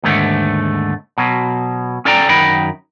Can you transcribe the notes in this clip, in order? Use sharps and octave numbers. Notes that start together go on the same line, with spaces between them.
D#2 G#2 D3 A3
B2 F#3
C#4 A4 D5 G5 A#5
F#2 D#3 F#3 D#5 G5 B5